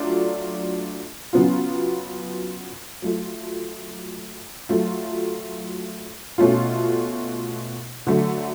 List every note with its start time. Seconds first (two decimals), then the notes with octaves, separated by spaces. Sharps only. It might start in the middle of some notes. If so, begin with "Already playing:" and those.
Already playing: F#3 A3 D4 F4
1.33 C#3 F#3 B3 F4
3.02 F#3 A3 F4
4.69 F#3 A3 F4
6.38 B2 A3 C#4 F4
8.07 D3 F#3 A3